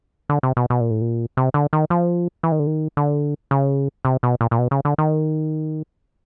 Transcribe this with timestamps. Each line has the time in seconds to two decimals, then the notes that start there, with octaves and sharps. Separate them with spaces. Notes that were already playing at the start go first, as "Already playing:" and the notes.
0.29 D3
0.43 C3
0.57 B2
0.70 B2
0.81 A#2
0.91 A2
1.01 A#2
1.37 C3
1.54 D3
1.73 D#3
1.90 F3
2.43 E3
2.52 D#3
2.59 D3
2.67 D#3
2.97 D3
3.51 C#3
4.05 C3
4.23 B2
4.41 A#2
4.51 A#2
4.59 B2
4.71 C#3
4.85 D3
4.98 D#3